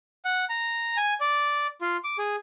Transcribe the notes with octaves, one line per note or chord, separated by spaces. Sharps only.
F#5
A#5
G#5
D5
F4
D6
G#4